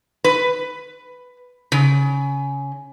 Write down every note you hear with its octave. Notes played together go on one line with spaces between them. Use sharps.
B4
C#3